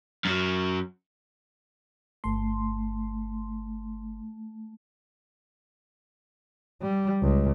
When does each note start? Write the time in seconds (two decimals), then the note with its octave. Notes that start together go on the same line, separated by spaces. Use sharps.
0.25 F#2 F#3
2.24 G1 A3 C6
6.82 G3
7.22 C#2